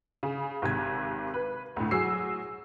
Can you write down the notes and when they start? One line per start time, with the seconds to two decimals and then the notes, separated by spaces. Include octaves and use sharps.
0.23 C#3
0.62 G#1 C3 G#6
1.34 B4
1.76 D2 A2
1.91 F#3 G#4 E6 C7